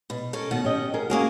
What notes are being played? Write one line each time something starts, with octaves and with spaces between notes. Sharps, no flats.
B2
C#4 A4 A#4
B2 D#3 F#5
C#4 G4 D#5
G#4 A#4
A#3 C#4 F#4 G#4 A#4